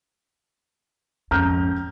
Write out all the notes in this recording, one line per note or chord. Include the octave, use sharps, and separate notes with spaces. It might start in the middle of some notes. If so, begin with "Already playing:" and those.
F2 G#2 C#4 A#5 F6 G6